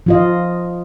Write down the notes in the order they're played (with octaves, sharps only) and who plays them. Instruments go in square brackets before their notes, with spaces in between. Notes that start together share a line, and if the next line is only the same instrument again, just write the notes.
[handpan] F3 F4 D#5